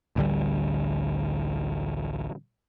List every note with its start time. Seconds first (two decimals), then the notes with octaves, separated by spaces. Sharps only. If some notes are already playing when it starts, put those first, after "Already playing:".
0.16 A1 D2 D3 G3